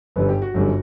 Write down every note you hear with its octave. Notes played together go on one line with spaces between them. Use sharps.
G1 F#2 D3 G3 B4
G4
F#4
G1 F#2 D3 G3